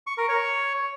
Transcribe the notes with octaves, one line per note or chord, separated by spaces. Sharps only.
C#6
A#4
C#5